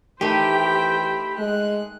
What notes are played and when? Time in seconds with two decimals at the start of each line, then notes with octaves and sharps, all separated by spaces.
0.21 D#3 E3 A3 G4 C5 G5 B5
1.38 G#3 F#6